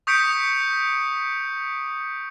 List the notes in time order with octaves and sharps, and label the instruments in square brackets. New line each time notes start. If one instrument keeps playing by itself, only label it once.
[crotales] C#6 D#6 G6 B6 C#7 D7